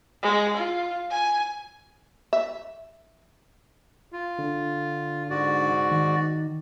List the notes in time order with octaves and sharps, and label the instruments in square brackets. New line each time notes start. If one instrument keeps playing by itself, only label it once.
[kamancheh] G#3
F4
G#5
[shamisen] E5
[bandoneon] F4
[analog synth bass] D3
[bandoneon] G#2 F#4 D5
[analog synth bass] D#3